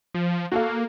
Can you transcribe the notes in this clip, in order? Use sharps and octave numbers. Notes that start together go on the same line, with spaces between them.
F3
A#3 F#4 A4 F5